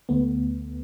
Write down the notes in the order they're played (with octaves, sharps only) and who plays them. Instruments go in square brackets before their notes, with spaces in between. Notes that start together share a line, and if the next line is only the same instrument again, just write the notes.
[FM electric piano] D2 A3 B3